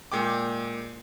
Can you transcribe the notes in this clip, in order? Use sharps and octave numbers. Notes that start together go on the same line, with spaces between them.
A#2 G#3 G5 D6